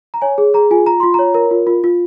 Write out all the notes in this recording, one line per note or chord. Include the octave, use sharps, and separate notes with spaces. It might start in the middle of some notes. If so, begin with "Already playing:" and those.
A#5
C#5 G#5
G#4
G#4 A#5
F4 G#5
F4 A#5
F4 C6
C#5 A#5
A#4
F4
F4
F4